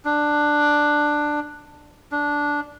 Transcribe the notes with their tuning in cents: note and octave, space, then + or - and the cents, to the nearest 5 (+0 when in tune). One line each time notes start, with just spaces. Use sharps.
D4 +10
D4 -10